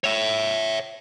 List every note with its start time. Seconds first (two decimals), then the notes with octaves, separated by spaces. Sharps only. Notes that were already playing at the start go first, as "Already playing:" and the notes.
0.04 C#5 E5